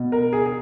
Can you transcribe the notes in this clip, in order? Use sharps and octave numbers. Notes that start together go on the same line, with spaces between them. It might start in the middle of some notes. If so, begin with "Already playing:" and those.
Already playing: B2
A#4
G#4
G#4